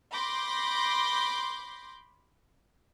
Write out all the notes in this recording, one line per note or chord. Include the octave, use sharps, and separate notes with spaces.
B5 C6 D6 G6 A#6